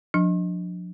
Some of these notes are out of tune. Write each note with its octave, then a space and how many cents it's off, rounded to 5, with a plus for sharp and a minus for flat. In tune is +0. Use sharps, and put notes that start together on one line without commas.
F3 +35 D4 +5